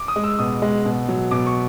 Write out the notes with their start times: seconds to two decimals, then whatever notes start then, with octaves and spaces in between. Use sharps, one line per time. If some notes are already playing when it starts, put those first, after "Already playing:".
Already playing: D6
0.08 D#6
0.16 G#3
0.24 E6
0.39 B2 D#6
0.62 G#3
0.85 B2
1.08 F#3
1.31 B2 D6
1.46 C#6